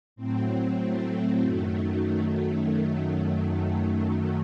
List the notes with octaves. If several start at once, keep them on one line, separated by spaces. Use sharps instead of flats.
A2 F#3 C4
A3
F#2 D#3 F#3 A3